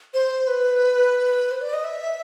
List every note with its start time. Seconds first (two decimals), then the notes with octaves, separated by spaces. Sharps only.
0.14 C5
0.47 B4
1.51 C5
1.61 D5
1.73 D#5
1.84 E5